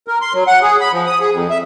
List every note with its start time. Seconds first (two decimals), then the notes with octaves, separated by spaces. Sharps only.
0.08 A#4
0.21 C6
0.34 F#3
0.47 F#5
0.62 G#4
0.81 B5
0.92 F3
1.06 D#6
1.20 G#4
1.33 F2
1.50 E5